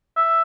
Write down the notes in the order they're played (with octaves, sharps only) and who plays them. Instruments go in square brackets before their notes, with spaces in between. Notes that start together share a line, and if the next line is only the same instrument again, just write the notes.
[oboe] E5